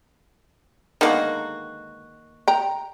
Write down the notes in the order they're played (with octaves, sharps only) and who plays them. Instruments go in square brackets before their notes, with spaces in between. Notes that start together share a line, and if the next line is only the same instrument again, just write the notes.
[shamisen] D3 G#3 B3 [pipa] D#3 A#3 F#4
[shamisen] G5 A#5